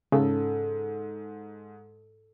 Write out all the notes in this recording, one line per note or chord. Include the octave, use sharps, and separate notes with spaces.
G#2 C#3 A4